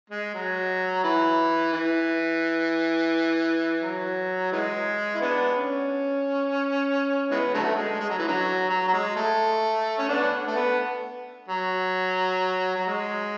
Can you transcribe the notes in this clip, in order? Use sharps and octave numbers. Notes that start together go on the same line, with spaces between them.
G#3
F#3
E3
E3
F#3
E3 G#3
E4
B3 D4
C#4
E3 G#3 B3
D3 F#3 A3
G#3
G#3
F#3
E3
D3 F#3
F#3
F#3
G#3
A3
C#4
B3 D4
A3
B3
F#3
F#3
G#3